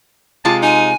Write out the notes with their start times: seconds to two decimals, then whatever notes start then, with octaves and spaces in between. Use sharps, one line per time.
0.45 C3 G#3 F4 A5
0.63 D#4 G#5